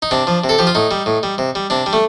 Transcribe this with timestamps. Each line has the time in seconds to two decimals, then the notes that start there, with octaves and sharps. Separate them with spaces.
0.02 D#4
0.11 C3 D4
0.27 F3
0.44 C3
0.49 A4
0.58 F3 G4
0.67 F4
0.75 A2 D#4
0.91 G3
1.06 A2
1.23 G3
1.38 C3
1.55 G3
1.70 C3 D4
1.86 G3
1.93 A3